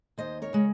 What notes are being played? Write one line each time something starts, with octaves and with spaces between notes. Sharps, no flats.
D#2 C5 D#5
A#4 C#5
C#3 G#3